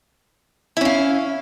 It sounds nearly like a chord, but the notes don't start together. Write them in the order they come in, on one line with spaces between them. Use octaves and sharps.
E4 C#4 F5